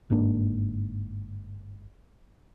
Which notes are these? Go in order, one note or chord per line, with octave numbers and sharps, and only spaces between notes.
G1 G#2 A#3 D4